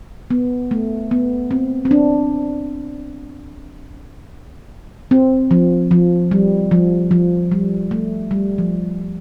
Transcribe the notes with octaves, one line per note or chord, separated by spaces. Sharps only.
B3
A3
B3
C4
C4
D4
C4
F3
F3
G3
F3
F3
G3
A3
G3
F3